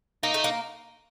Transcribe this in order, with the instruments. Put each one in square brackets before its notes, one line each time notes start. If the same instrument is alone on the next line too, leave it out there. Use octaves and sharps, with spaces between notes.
[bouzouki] A#3 [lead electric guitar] D#4
[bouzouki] A3
A#3